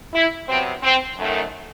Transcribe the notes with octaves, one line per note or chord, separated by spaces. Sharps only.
E4
C3 F#3 B3 C4
C4
F#2 D#3 A3